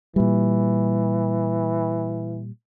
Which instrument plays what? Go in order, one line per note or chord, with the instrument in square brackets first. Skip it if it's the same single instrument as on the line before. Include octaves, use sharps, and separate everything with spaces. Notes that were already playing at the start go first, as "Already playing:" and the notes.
[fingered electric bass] A#2 G3 [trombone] E3